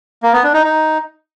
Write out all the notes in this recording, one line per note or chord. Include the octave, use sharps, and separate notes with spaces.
A#3
B3
D4
D#4
D#4